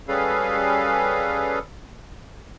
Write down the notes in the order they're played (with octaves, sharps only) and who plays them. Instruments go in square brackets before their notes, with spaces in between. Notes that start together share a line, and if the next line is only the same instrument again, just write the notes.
[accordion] G3 C#4 G#4 A4 B4 F5